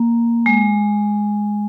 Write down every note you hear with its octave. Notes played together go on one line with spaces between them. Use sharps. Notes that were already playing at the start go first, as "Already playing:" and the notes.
Already playing: A#3
G#3